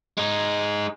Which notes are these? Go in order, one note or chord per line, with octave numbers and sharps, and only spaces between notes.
G#3 D#4